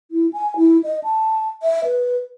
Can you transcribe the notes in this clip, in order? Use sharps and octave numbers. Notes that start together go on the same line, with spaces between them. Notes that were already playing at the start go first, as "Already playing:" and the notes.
E4
G#5
E4
D#5
A5
E5
B4